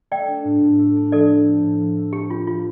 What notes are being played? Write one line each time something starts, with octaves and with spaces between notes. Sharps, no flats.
A3 D5 G5
D4
A2
A2
A3
D4
F3 A4 D5
A3
C4
A2
F3
A3
C4 G4
F4 G4
F3 F4